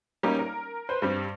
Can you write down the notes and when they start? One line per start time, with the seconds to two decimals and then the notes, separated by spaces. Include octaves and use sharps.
0.23 G3 A#3 C#4 D#4
0.39 A#4
0.89 B4 C5
1.02 G2 G3 C4